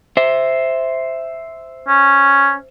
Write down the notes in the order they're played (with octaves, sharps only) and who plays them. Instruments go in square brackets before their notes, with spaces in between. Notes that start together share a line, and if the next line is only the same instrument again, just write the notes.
[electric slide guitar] C5 E5
[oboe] C#4